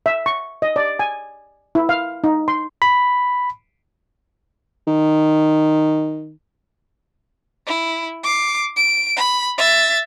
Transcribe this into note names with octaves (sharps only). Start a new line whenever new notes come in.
E5
C#6
D#5
D5
G#5
E4
F5
D#4
C6
B5
D#3
E4
D6 C7
D7
B5
E5 A6